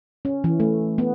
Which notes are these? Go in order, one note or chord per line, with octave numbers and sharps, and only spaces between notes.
C#4
E3
A3
B3